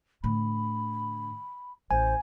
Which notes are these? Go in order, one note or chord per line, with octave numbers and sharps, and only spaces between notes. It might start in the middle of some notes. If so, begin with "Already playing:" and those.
A2 D3 B5
A1 C5 G#5